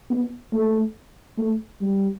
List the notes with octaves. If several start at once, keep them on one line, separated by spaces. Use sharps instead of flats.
B3
A3
A3
G3